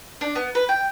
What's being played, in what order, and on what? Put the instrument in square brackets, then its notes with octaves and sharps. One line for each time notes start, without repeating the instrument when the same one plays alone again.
[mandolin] D4
B3
B4
G5